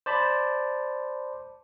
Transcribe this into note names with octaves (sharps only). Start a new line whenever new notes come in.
C5 D5 A5 B5